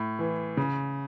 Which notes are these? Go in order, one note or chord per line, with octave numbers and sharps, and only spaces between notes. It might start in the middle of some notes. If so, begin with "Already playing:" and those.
Already playing: A2
E3
C#3